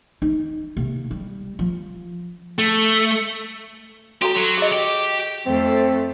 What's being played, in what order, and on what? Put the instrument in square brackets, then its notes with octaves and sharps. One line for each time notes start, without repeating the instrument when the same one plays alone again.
[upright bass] D#4
C3 A#3
G3
F3
[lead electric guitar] A3
[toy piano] F#4 A4 A#5 [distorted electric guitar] G4
[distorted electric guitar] F#3
[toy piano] G#4 D#5
[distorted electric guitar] G4
[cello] F2 A3 [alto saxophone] C4